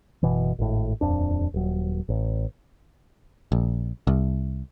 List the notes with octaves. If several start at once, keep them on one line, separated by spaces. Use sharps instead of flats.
F#1 B2 E3
G#1 A2
D#1 F2 D4
D#1 F#3
A1
A#1
C2